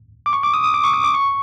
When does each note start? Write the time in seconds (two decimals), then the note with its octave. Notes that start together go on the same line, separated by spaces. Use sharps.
0.26 D6
0.33 C#6
0.43 D6
0.54 D#6
0.64 D#6
0.74 D6
0.84 C#6
0.93 D#6
1.04 D6
1.14 C#6